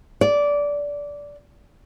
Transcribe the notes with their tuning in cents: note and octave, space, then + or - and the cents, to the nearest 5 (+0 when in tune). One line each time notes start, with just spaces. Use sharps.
D5 -15